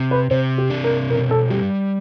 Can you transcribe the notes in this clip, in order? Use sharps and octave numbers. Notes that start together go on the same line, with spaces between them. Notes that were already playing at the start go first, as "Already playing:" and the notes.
Already playing: C3
B4
C3 C5
G4
D4
A#4
B2 A#4
A4
G3 G4